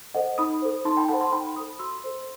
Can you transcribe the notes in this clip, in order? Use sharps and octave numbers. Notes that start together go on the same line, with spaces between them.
A4 C5 D#5 F#5
D#4 B5 D#6
A4 C5
D#4 A5 C6
G5 B5
A4 C5 F#5 A5
A5 C6
D#4 G5 B5
A4 C5 B5 D#6
F#4 C6 E6
A4 C5